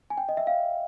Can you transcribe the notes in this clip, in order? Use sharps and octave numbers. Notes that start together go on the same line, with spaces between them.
G#5
G5
D#5
E5
F5